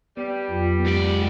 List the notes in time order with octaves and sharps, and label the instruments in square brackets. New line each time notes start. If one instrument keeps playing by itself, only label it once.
[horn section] G3 [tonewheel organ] B3
[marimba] F2 F#3 F4
[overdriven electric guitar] G#2 D5 [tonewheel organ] G4